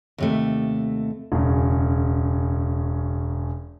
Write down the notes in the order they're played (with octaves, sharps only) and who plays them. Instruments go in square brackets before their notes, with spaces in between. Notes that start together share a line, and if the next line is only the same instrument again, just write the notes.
[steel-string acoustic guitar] D#2 C3 A3
[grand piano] E1 F#2 C#3